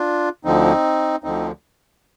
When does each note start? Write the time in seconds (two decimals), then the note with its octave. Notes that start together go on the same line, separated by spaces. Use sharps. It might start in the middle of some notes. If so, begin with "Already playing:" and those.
Already playing: D4 F4
0.45 D2 D3 F3 C4 D#4
1.24 D2 D3 F3 C4 D#4